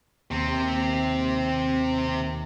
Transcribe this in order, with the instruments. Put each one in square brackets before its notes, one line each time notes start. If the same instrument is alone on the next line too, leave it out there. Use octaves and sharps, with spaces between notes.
[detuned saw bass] D#2 [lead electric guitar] C3 C4